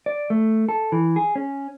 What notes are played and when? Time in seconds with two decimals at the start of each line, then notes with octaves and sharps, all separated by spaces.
0.06 D5
0.30 A3
0.69 A4
0.92 E3
1.16 G#4
1.35 C#4